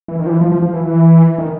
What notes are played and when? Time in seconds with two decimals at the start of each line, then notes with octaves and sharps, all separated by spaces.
0.08 E3
0.19 D#3
0.26 F3
0.30 E3
0.41 F3
0.52 F3
0.62 F3
0.74 E3
0.85 E3
1.38 D#3